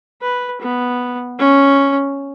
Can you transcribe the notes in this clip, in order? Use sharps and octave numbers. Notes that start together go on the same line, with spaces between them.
B4
B3
C#4